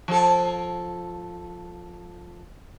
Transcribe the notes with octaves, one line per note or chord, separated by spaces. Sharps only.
F3 A4